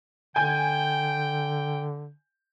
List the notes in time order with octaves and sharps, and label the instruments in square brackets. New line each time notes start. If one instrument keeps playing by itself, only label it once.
[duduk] D3 [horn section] G5 [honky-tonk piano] G#5 G6